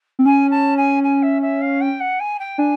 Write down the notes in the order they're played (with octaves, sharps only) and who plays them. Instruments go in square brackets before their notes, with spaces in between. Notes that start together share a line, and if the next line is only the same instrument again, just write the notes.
[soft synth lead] C4
[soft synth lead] C#4 [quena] G#5
[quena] A5
G#5
G#5
E5
E5
F5
G5
F#5
G#5
G5
[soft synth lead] D4 [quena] G#5